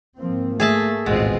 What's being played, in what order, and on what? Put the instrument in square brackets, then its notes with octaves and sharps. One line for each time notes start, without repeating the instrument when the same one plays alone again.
[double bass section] G#2 F3 C4 [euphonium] A#3
[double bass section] A3 [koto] G#4 E5 A5
[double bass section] A1 D#2 G#2 [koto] B2 [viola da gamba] G#3 C4 F4